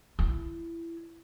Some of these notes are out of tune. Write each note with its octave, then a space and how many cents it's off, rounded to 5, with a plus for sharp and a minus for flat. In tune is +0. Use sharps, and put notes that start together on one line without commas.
E4 +20